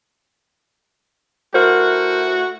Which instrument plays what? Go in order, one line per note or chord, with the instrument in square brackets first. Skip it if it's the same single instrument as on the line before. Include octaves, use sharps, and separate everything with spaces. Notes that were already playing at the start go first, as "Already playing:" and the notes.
[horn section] A3 E4 F#4 [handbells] A#4 C5